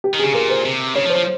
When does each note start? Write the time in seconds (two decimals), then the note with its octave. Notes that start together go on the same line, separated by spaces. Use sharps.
0.04 G4
0.14 D#3
0.19 G#4
0.24 C#3
0.34 A#2 A#4
0.50 C5
0.65 C3
0.95 C#3 C#5
1.05 F3
1.10 C5
1.16 F3